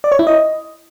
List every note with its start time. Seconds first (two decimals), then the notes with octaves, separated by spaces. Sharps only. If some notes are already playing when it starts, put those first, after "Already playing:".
0.04 D5
0.12 C#5
0.19 E4
0.27 D#5